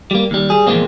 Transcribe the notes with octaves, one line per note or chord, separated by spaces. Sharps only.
G3 A#3
D#2 G3
G3 G#4
E2 A#2 F3 G#3 A#3 C4